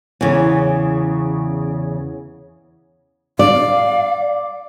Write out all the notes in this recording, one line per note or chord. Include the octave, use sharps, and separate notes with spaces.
E2 C#3
D5 F5